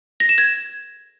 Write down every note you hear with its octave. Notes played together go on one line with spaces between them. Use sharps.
A#6
E7
G#6